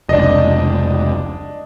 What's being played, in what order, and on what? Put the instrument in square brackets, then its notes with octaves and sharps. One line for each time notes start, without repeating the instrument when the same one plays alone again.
[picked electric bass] F1 C#2 [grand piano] D4 D#5